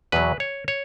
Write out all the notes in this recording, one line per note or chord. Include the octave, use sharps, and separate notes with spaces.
E2 B2 F#3 B4
C#5
C#5